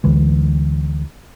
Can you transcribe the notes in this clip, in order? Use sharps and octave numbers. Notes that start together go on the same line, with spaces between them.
D2 D3 E3 G#3